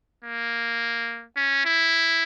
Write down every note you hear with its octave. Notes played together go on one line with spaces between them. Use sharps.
A#3
C#4
E4